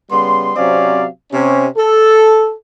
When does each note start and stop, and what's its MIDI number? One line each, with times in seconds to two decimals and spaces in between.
0.10 0.50 49
0.10 0.50 55
0.10 0.50 59
0.10 0.50 84
0.56 1.05 48
0.56 1.05 54
0.56 1.05 60
0.56 1.05 61
0.56 1.05 74
0.56 1.05 77
1.31 1.66 48
1.31 1.66 61
1.76 2.52 69